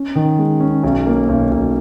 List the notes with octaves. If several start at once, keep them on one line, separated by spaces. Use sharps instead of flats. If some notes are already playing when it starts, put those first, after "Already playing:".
Already playing: C#4
D#3
G#3
C#4
B1
A#3
B1
B1